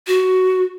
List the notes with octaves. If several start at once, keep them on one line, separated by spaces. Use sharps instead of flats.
F#4